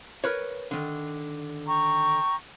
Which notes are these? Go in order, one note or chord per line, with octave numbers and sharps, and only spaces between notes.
A#4 B4 C#5
D3 D#3
G5 A#5 C#6